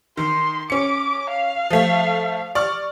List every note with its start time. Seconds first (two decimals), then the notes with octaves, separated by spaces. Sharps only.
0.17 D#3 C6
0.70 C#4 D6 C#7
1.30 F5
1.70 F3 A3
2.55 D5 C#6 F6